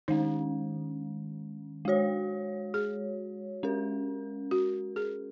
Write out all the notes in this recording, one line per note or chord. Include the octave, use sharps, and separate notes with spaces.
D#3 G#3 C#4 D#4
G#3 F#4 C#5
G#4
G#3 C#4 A#4
F#4
G#4